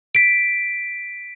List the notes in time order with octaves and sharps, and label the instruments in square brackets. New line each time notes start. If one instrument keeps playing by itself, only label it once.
[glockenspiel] B6 D7